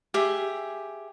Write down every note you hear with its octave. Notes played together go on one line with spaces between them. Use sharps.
G4 G#4 E5